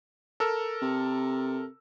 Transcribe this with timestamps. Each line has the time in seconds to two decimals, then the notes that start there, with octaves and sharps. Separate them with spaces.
0.40 A4 A#4 E6
0.82 C3